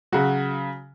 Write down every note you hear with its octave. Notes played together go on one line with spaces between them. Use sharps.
C#3 F#3 F#4